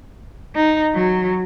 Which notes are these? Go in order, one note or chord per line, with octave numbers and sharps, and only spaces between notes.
D#4
F#3